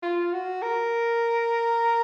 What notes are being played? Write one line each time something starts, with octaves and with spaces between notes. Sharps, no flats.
F4
F#4
A#4